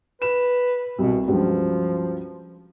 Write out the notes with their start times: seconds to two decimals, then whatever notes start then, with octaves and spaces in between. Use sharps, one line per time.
0.22 B4 E7
0.99 C2 B2
1.27 C#2 G2 F3 F#3